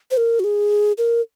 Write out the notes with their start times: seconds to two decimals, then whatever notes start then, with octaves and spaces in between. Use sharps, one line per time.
0.11 C5
0.17 A#4
0.40 F#4
0.44 G#4
0.98 A#4